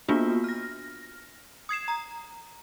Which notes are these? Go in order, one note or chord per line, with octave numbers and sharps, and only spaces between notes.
A#3 B3 D4 F4 F#4
F6 A#6
D#6 G#6 C7 E7
A#5